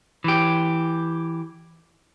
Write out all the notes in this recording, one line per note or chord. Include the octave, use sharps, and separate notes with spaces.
E3 G4